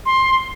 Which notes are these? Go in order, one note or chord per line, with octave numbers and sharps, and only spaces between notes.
C6